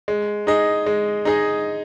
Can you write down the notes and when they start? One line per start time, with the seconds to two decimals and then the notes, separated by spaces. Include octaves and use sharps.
0.08 G#3
0.47 D#4 G#4 D#5
0.86 G#3
1.25 D#4 G#4 D#5